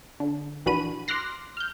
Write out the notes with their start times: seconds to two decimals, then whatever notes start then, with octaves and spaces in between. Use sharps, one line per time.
0.20 D3
0.66 A#1 E3 D4 F#4 B5 D#7
1.08 C6 D6 F6 F#6 A#6 C7
1.57 F6 G6